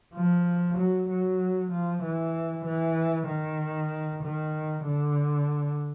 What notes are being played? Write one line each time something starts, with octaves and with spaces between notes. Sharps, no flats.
F3
F#3
F#3
F3
E3
E3
D#3
D#3
D3